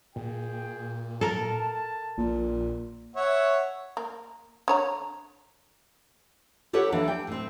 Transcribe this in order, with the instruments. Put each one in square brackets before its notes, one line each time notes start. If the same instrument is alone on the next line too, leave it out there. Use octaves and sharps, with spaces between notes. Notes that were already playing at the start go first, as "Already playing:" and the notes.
[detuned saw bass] A#2 [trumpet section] G#4 G5
[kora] A4 A#4 [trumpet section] A5
[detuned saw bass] A#1 [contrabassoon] A#2
[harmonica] C#5 E5 F#5
[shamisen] A#3
D3 C#5 A#5
[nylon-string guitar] G4 A4 B4 C#5 F#5
E3 A#3 D4
G5
A2 C4